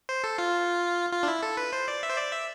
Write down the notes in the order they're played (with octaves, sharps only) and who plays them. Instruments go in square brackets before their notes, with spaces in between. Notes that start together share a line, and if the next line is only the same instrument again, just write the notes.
[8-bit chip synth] C5
A4
F4
F4
D4
E4
A4
B4
C5
D5
E5
C5
D5
E5